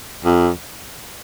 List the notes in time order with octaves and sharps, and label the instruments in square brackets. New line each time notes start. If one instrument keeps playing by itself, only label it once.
[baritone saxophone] F2